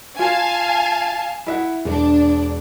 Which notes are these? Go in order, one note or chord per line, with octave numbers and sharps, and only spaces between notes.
F4 F5 G#5 A5
E4 E5 F#5
E1 D4